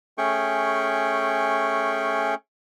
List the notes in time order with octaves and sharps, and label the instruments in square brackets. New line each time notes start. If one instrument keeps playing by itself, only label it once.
[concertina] A3 C#4 G#4 G5 C#6